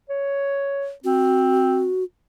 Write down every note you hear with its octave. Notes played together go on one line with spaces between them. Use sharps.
C#5
C4 F#4